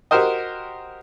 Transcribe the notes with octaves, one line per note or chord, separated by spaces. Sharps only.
F#4 G4 A#4 C5 D#5